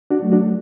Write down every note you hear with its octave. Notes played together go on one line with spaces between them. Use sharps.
D4 F#4
F#3 A3
D4 F#4